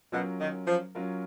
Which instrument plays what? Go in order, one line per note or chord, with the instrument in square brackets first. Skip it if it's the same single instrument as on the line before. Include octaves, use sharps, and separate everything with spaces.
[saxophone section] B2 [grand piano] F#3 C#4 F4 A#4
[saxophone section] D#3
F3
[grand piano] F#3 C#4 F4 A#4